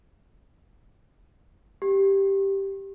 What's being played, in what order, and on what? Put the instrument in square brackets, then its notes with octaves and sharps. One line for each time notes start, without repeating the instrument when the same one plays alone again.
[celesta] G4